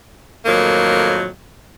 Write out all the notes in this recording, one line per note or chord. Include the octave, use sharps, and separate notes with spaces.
F2 A2 D#3 F#3 A#3